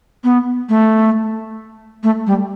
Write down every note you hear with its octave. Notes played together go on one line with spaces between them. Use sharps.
B3
A3
A3
G3